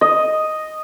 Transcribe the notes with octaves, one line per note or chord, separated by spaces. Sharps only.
D#5